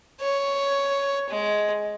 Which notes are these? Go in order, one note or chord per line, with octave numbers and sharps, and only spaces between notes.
C#5
G#3